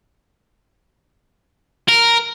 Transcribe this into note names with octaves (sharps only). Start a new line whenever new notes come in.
A#4